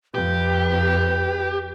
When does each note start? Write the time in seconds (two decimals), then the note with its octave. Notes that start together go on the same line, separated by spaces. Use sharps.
0.15 F2 G4 B4 G6